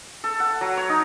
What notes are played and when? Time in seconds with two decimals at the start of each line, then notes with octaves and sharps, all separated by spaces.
0.24 A4
0.40 F#5
0.61 F#3
0.77 C#5
0.89 D#4